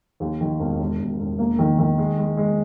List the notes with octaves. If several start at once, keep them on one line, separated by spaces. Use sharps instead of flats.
D#2
D#3
E1
E1
E1
E1
A#3
D#3
D#3
G#3
G#3
G#3